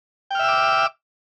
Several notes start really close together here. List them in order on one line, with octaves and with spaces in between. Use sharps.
G5 F6 E5 E6 D6